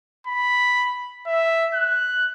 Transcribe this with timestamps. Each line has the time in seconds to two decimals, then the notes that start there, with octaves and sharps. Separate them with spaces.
0.27 B5
1.27 E5
1.74 F#6